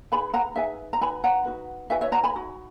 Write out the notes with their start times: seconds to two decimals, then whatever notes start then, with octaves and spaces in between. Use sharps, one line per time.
0.12 D#4 G#4 B4 G#5 B5
0.34 F#5 A#5
0.56 D#4 G#4 B4 E5 G#5
0.93 A#5
1.01 D#4 F#4 B4 G#5 B5
1.24 F#5 A#5
1.45 D#4 F#4 B4
1.90 D#4 F#4 B4 E5 G#5
2.01 C#5 E5
2.12 F#5 A#5
2.24 G#5 B5
2.35 D#4 F#4